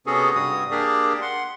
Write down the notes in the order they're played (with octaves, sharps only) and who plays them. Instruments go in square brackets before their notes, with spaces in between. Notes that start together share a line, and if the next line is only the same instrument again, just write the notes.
[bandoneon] C3 B3 C#4 F#4 G#4 A4
G2 C3 G3 F#4 D#6
A#3 D4 G4 G#4 A#4 D5
F#5 C6